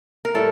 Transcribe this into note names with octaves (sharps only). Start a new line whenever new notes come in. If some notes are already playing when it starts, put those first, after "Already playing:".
A#4
A2 G3 A4